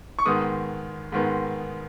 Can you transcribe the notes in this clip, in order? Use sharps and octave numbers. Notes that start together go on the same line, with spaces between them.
C#6
G#2 D#3 G#3 B3 D#6
G#2 D#3 G#3 B3